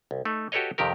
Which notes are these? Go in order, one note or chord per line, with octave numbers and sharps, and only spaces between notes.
C2
A3 D#4
F#4 G4 A4 B4 C#5 D#5
F2 C3 D#3 G4 A#4